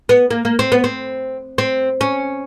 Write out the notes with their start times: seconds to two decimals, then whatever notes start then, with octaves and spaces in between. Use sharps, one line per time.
0.09 B3
0.31 A#3
0.45 A#3
0.59 C4
0.72 B3
0.84 C4
1.58 C4
2.01 C#4